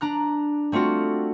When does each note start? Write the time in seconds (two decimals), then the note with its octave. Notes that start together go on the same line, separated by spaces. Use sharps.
0.01 D4 A#5 F#6
0.72 G3 A3 C4 F4 F#4